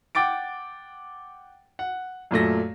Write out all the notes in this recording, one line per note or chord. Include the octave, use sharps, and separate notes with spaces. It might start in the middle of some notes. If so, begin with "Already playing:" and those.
F#5 G5 D6 A6 D7
F#5
F#2 A#2 A3 A#6